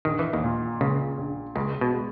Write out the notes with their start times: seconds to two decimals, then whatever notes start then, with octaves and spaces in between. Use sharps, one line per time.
0.05 A#1 D#3
0.19 E3
0.33 D#2 D#3
0.44 A#2
0.80 C#2 A#2 C#3
1.18 A#1
1.55 C#2 C#3 G#3
1.81 B2
1.94 G#3